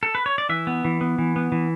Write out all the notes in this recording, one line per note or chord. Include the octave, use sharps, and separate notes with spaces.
A4
B4
C#5
D5
E3 E5
B3
E3
B3
E3
B3
E3